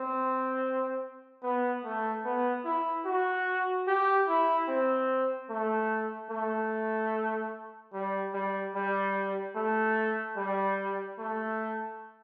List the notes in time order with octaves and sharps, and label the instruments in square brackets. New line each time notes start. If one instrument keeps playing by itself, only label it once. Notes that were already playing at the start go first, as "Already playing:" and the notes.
Already playing: [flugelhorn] C4
B3
A3
B3
E4
F#4
G4
E4
C4
A3
A3
G3
G3
G3
A3
G3
A3